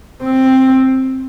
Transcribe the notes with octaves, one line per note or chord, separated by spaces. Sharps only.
C4